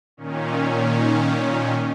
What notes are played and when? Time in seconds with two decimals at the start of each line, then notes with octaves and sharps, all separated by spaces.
0.17 A#2 D#3 C#4